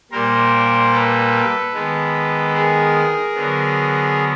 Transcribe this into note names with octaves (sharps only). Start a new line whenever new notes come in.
A#2 G3 A#3 A#4 C5
A4 B4
D#3 G#3 B3
G#4 A#4
D3 F#3 B3